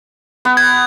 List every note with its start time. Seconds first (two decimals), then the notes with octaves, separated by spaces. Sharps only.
0.45 B3
0.57 G#6